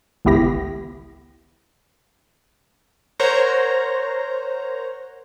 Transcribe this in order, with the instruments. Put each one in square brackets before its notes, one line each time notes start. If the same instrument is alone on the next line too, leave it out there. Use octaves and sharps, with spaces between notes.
[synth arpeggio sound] G#1 C#2 B3 E4 G4 A#6
[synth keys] A#4 C5 C#5 F#5 A#5